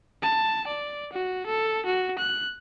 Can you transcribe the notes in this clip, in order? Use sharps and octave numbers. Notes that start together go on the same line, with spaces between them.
A5
D5
F#4
A4
F#4
F#6